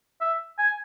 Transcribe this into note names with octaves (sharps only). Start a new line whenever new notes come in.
E5
G#5